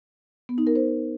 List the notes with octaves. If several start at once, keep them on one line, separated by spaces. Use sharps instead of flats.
B3
D#4
A#4
C5